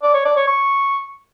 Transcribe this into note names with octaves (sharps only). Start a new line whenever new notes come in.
D5
C#5
D5
C#5
C#6